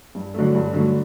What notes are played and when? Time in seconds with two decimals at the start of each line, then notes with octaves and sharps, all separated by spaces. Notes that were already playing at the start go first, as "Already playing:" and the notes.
0.15 G2
0.34 D3 F#3 A3
0.55 G2
0.73 D3 F#3 A3